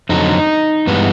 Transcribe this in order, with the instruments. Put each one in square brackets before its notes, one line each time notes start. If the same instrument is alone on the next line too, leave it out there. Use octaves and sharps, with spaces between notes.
[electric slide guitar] F2 D3 F#3 D#4
G2 E3 G#3 B3